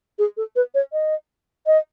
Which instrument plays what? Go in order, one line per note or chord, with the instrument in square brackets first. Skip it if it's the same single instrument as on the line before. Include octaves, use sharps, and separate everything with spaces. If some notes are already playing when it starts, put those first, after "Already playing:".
[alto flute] G#4
A4
B4
C#5
D#5
D#5